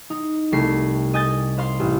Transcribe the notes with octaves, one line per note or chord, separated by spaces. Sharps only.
D#4
C2 A3 C7
D#5 G#5 G6 A6
C5 F5 C6
A1